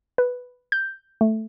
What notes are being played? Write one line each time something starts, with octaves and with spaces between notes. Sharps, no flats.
B4
G6
A3